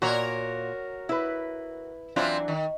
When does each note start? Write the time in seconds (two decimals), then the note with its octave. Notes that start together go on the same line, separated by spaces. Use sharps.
0.02 A#2 F#4 A#4 C#5
1.09 E4 B4
2.16 E3 F#3 C4 D4 E4 F4
2.48 D#3